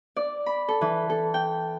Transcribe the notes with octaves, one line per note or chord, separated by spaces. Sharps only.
D5
B5
A4
E3
A4
G5